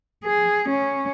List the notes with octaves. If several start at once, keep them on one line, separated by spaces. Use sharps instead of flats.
G#4
C#4